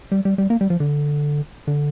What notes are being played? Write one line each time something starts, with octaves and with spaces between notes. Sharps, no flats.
G3
G3
G3
A#3
G3
F3
D3
D3